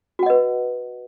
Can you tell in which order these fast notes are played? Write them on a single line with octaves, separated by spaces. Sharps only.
F#4 F#5 D#5 B4